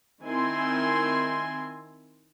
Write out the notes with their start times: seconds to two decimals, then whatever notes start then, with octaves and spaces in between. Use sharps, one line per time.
0.24 D#3 C4 E4 G#5 C6